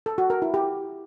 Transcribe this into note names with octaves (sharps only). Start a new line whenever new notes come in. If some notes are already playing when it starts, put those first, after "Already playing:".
A4
F#4
A#4
E4
G4